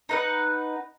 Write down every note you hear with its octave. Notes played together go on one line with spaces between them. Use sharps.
D#4 B4 F#5